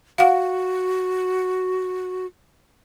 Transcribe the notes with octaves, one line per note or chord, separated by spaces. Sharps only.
F#4 F5 F#5